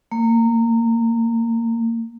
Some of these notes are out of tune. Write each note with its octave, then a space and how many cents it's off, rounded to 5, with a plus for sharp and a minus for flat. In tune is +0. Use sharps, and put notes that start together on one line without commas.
A#3 -20